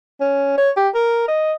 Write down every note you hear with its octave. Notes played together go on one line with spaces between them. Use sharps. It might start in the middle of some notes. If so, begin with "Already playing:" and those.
C#4
C#5
G4
A#4
D#5